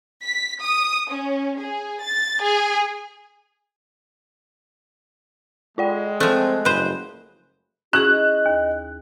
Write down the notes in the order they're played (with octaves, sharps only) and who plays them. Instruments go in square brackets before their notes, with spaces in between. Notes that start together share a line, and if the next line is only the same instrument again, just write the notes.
[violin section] B6
D#6
C#4
G#4
A6
G#4
[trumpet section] G#3 [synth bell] F4 D5 G5
[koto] F3 A3 [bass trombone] C4 [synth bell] F#6
[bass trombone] F#1 [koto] B4 C5
[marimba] C#4 E4 G#4 [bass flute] F#4 [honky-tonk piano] F#6
[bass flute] D#5
[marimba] D#2